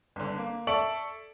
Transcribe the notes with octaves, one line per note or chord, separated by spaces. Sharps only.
G1 D3
A#3
A4 D5 E5 C#6 D7 F#7